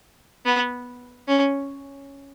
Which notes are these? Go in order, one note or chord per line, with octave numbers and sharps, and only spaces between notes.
B3
C#4